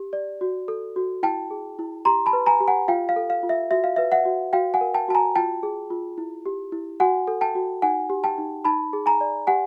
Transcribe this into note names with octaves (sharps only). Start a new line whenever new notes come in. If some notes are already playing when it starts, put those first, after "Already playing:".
Already playing: G4
D5
F#4
A4
F#4
E4 G5 A5
G#4
E4
G4 A#5 C6
A5 B5
B4
G#5 A#5
G4
F#5 G#5
F4 F5 G5
F5
A4
F5
F4
E5
F#4 E5
F5
B4 E5
E5 F#5
F#4
F#4 F5 G5
F#5 G#5
A#4
G5 A5
F#4 A5
G#5 A#5
F4 G5 A5
G#4
F4
E4
G4
E4
F#4 F#5 G#5
A4
G5 A5
F#4
D#4 F#5 G#5
G4
G5 A5
D#4
D#4 A5 B5
G#4
G#5 A#5
D5
G4 F#5 G#5